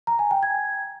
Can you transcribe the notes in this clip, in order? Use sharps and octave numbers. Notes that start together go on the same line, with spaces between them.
A#5
G#5
G5
G#6